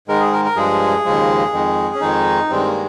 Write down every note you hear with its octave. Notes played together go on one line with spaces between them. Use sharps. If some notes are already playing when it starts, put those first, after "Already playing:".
G#2 D#3 G#3 A#4
G#4
A#4
A#4
G2 F3 G#3 G#4
D#2 C#3 F3 G#3
F2 D#3 G#3
C#4
F2 D#3 G#3 D#4
G2 D#3 G#3 C4
A#3